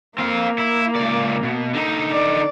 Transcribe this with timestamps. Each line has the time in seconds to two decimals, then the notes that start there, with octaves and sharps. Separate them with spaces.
0.19 A#3 C4 F5
0.58 E4
0.96 C#2 D5
1.43 B2
1.73 D3 D#4
2.13 D5